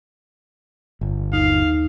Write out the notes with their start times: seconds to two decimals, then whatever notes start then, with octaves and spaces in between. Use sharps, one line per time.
1.01 G1
1.33 D#2 D#4 F5